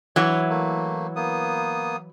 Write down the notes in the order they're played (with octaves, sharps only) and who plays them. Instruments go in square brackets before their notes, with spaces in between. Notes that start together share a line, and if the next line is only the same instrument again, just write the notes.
[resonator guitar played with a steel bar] E3 F#3 [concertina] C#5
[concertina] A3 A#3
A#3 B3 D#6